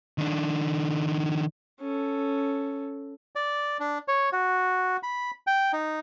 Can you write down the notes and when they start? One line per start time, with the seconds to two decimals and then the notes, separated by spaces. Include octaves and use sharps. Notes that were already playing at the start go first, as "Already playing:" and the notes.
0.18 D#3 D4
1.81 C#4 A4
3.36 D5
3.80 D4
4.08 C#5
4.32 F#4
5.03 B5
5.47 G5
5.73 D#4